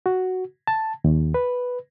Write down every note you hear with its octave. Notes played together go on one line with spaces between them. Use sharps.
F#4
A5
D#2
B4